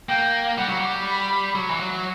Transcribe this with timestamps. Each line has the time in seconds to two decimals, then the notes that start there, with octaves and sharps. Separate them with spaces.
0.09 A#3 G5
0.58 G3 F#5
0.69 F#3
0.79 G3
1.07 B5
1.55 F#3
1.70 E3
1.80 F#3